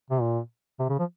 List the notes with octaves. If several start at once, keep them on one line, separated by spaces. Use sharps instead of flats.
C3
A#2
C3
C#3
F3